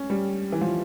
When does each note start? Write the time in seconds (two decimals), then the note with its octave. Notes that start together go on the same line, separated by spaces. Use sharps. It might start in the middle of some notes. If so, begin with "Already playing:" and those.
Already playing: C#4
0.10 G3
0.52 E3
0.61 F3